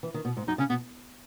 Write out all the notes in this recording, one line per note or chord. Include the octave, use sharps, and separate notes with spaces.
E3
D#3
B2
G#2
F#2 D#4
C#3 C#4
B2 B3